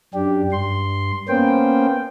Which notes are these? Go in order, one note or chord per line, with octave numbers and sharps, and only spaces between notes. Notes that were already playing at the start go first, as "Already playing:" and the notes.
F#2 D4 G4
G2 C6
A#3 B3 C#4 C5 G5